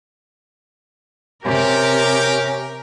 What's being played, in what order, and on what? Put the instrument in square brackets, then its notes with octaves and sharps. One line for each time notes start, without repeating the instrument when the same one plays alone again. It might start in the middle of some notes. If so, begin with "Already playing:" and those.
[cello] C3 [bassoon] C#4 [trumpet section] G4 [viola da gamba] A#4